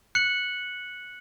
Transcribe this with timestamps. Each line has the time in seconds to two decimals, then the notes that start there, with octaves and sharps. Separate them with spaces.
0.15 F#6 C#7 F#7